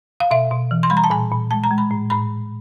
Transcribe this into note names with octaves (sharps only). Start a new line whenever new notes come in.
F5
B2 E5
B2
E3
C6
G3 B5
A#5
A5
A#2 G#5
A#2
G#3 A5
A#5
G#3
B5
A2
A2 B5